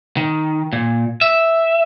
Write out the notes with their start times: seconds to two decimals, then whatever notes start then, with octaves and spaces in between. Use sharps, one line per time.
0.17 D#3
0.73 A#2
1.21 E5